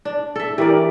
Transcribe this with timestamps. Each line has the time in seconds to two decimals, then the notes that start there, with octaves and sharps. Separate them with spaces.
0.05 D4
0.36 A4 E5
0.58 E3 G4 A#4 D5